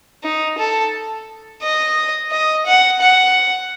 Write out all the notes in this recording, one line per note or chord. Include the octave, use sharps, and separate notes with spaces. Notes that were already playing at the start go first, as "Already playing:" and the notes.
D#4
A4
D#5
D#5
F#5
F#5